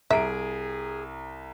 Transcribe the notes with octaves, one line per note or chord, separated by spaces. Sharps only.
C2 G#4 E5 A#5 D7